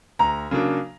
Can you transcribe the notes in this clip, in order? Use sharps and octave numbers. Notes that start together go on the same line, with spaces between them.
D2 A#5
C#3 F#3 A#3 D4